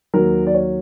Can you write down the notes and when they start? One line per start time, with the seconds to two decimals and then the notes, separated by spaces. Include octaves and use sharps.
0.14 D#2 D#3 F#3 A#4
0.47 D5
0.55 C#5